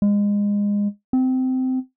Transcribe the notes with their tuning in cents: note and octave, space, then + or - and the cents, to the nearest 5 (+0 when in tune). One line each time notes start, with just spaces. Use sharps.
G#3 -25
C4 -20